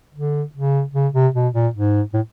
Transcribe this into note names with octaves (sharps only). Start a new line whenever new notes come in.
D3
C#3
C#3
C3
B2
A#2
G#2
A2